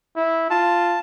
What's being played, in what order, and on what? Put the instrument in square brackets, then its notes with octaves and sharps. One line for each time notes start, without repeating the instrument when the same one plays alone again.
[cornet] E4
[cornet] F4 [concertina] A5